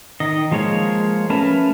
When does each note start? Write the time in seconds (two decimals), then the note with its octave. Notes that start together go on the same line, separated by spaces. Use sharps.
0.20 D#3 D#5
0.51 F3 G#3 A#3 C#5
1.30 A3 C#4 A#4 B4 A5